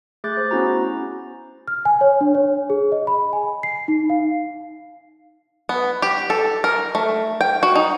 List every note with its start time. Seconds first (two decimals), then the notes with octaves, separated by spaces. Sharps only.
0.24 A3 G#4 D6 F#6 G6 A6
0.37 C5
0.51 B3 C#4 E4 F#4 A#5
1.68 F6
1.85 G#5
2.01 C#5
2.21 D4
2.35 C#5
2.70 G#4
2.92 D#5
3.07 B5
3.33 G#5
3.63 C7
3.88 D#4
4.10 F5
5.69 B3
6.02 G4
6.30 A4
6.64 A#4
6.95 A3
7.41 G5
7.63 F#4
7.76 D#4